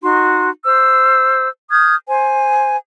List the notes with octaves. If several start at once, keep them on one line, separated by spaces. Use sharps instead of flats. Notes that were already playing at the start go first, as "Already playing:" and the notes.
D#4 F#4 C6
C5 E6
D#6 F6 G6 G#6
C5 G#5